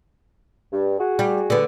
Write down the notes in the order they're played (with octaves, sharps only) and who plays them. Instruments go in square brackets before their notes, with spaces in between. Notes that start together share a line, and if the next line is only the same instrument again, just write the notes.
[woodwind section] G2
F#4 G#4
[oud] G3
D3 B3